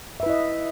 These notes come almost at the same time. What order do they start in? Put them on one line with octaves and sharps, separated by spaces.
E5 B4 E4 D#5